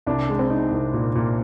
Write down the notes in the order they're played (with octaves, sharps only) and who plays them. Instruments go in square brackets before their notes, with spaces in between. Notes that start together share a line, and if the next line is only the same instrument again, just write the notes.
[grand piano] C2 [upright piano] D4
[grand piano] G#3
[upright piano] C4
[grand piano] D#4
C2
A#2
A#2